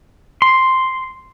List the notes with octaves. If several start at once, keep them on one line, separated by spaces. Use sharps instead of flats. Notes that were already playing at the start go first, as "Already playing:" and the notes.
C6